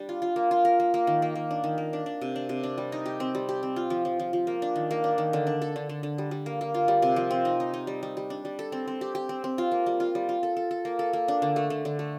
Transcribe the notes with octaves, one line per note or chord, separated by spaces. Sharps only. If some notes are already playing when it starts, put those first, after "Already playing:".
Already playing: G3 D4
F4
F4
A#3
F4
A#4
A#3
A#3
D#3
A#3
A#3
D4
D#3
A#3
D4
D4
C3
D4
C3
D4
G3
D#4
G4
C4
G3
G4
C4
F4
F3
F3
F3
F3
A#3
D4
D#3
A#3
D4
D#3
D3
D4
A4
D3
D3
D3
G3
G3
A#3
A#3
F4
G3
C3
F3
C4
D#4
D#4
D#4
G3
G3
G3
D4
G3
A4
C4
C4
G4
G4
C4
C4
F4
A#3
G3
F4
G3
F4
A4
A4
A4
A#3
A4
A#3
D4
D3
A3
D3
D3
A3